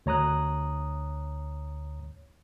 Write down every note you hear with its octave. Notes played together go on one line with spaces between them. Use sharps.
D2 C#5 A#5 D#6 F#6